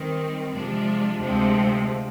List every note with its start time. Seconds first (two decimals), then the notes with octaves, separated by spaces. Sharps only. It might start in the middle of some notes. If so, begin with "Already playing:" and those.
Already playing: D#3 G3 C4
0.55 C3 F3 G#3 D4 F4
1.21 D2 C3 F3 G#3 C4